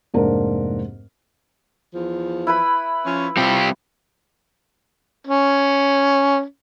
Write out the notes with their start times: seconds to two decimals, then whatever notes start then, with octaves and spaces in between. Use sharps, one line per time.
0.14 F1 G#2 A#3 D4 A#4 C5
1.94 E2 F3
2.47 E4 B4 B5
3.05 F3 C#4
3.37 C3 G3 C4 F4 G4
5.27 C#4